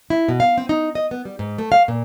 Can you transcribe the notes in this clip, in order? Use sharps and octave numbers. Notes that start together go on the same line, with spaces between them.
E4
B2
F5
C4
D#4
D#5
B3
G3
G#2
A3
F5
A#2